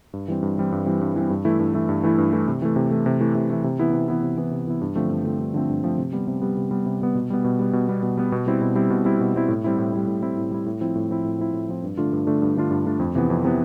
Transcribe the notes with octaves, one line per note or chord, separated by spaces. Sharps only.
G2
E3 G3 C4
G2
E3 G3 C4
G2
E3 G3 C4
G2
E3 G3 C4
G2
E3 A3 E4
G2
E3 A3 E4
G2
E3 A3 E4
G2
E3 A3 E4
C3
E3 A3
C3
E3 A3
C3
E3 A3
C3
E3 A3
C3
E3 B3 E4
C3
E3 B3 E4
C3
E3 B3 E4
C3
E3 B3 E4
G2
D3 F3 A3 C4
G2
D3 F3 A3 C4
G2
D3 F3 A3 C4
G2
D3 F3 A3 C4
C3
G3 B3
C3
G3 B3
C3
G3 B3
C3
G3 B3
B2
G3 B3
B2
G3 B3
B2
G3 B3
B2
G3 B3
B2
G3 C4 E4
B2
G3 C4 E4
B2
G3 C4 E4
B2
G3 C4 E4
A2
G3 C4 E4
A2
G3 C4 E4
A2
G3 C4 E4
A2
G3 C4 E4
A2
F3 C4 E4
A2
F3 C4 E4
A2
F3 C4 E4
A2
F3 C4 E4
G2
D3 A3 D4 F4
G2
D3 A3 D4 F4
G2
D3 A3 D4 F4
G2
D3 A3 D4 F4
F2
C3 E3 B3
F2
C3 E3 B3